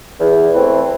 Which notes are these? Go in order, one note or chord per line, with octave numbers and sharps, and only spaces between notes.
E2
E3 A3 C4